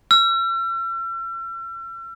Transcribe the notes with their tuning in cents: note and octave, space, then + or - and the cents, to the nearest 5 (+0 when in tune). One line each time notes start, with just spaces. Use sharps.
E6 +45